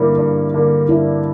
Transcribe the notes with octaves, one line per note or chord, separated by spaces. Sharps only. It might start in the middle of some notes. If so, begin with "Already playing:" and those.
Already playing: G2 D3 G3 A#3 D4 E4
G2
D3 G3 A#3
G2 D4 E4